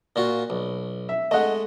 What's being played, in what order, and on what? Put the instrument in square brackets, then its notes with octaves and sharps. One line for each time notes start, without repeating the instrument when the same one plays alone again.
[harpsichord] A#2 F4 F#4
B1
[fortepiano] E5
[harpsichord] G#3 A3 [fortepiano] D#5 F#5